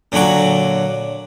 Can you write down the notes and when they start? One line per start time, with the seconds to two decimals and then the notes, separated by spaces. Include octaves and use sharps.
0.12 A#2 D3 F#3 F#4 D6